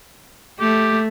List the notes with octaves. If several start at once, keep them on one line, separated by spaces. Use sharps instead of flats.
A3 G4